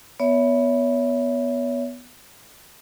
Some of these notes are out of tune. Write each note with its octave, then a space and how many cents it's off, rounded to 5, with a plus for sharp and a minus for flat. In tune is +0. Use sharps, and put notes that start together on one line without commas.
B3 +0 C#5 +30 E5 +0